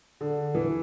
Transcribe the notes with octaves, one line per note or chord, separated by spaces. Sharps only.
D3
E3